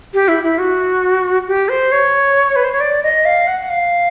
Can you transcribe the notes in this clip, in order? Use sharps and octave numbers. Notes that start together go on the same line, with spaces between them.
G4
E4
E4
F#4
G4
C5
C#5
B4
C5
C#5
D5
D#5
F5
F#5
F#5
F5